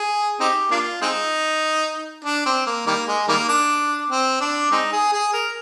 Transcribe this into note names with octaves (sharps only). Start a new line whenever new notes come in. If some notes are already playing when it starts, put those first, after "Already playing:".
Already playing: G#4
C4 D#4 G4
A#3 D4 F4
G#3 C4 D#4
D4
C4
A#3
D#3 G3 A#3
G#3
D#3 G3 A#3
D4
C4
D4
G#3 C4 D#4
G#4
G#4
A#4